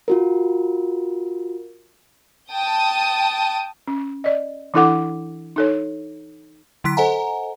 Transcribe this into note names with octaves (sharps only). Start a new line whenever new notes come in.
F4 F#4 A#4
G5 A5 D#6
C#4
D5 D#5
E3 D4 E4 A4 F#5 D6
D#4 A4 C#5
D3 F#3 E4 C6 F#6 B6
A4 C5 D#5 F#5 G#5 A#5